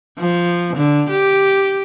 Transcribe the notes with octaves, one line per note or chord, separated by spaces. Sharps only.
F3
D3
G4